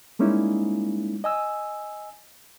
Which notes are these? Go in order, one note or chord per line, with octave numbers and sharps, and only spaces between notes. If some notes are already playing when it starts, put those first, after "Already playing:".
G3 G#3 A#3 C#4 D#4 E4
D#5 G#5 E6